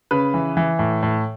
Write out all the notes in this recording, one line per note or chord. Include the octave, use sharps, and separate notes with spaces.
C#3 B4
E3
E3
A2
A2